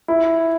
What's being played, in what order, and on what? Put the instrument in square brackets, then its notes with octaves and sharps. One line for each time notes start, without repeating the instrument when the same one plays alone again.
[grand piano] E4